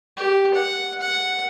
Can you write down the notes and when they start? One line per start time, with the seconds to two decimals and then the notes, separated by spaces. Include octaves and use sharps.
0.17 G4
0.54 F#5
1.00 F#5